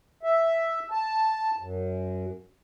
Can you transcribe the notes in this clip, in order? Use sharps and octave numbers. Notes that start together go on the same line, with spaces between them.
E5
A5
F#2